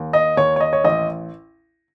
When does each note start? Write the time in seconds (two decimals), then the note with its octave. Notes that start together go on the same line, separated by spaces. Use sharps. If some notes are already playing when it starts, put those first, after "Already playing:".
Already playing: D#2
0.13 D#5
0.37 D#2 C#5
0.56 C#5
0.60 D#5
0.73 C#5
0.84 A1 D#5